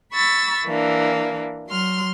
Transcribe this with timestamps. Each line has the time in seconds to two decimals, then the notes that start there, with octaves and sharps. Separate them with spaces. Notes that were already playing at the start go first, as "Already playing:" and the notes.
0.13 B5 C#6 E6 A6
0.65 E3 A#3 D4
1.67 F#3 C6 F6